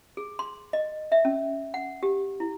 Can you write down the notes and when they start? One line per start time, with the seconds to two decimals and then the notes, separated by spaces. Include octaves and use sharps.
0.17 G#4
0.39 C6
0.73 D#5
1.12 E5
1.25 C#4
1.74 F#5
2.03 G4
2.40 E4